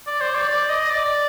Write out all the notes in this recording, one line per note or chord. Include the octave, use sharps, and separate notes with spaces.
D5
C5
D5
D5
D#5
D5